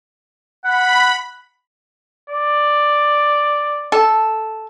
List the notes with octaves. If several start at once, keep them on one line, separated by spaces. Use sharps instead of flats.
F#5 B5
D5
A4